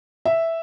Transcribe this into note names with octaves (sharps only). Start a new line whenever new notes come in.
E5